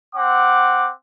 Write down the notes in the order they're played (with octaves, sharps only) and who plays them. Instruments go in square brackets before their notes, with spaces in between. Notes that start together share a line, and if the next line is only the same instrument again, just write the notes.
[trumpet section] C4 F#5 D6